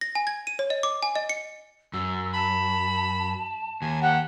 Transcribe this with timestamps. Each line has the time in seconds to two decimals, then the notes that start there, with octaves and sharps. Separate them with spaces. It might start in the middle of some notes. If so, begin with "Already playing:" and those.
0.01 A#6
0.15 G#5
0.27 G#6
0.47 D#7
0.59 C#5
0.70 D#5
0.83 D6
1.03 G#5
1.15 D#5
1.29 C#7
1.94 F#2 E6
2.34 A5 B5
3.82 D#2 G#5
4.02 G4 F#5